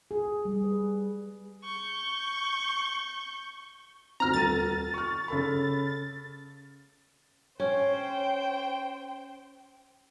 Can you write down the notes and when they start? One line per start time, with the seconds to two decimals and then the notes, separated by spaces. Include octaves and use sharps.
0.11 G#4
0.45 G3
0.63 B4
1.64 C#6 G6
4.20 D2 C4 A#5 F6
4.34 D#1 A4 A6 D#7
4.94 C#6 F6
5.28 C#3 A4 B5
7.60 C#4 C5 G5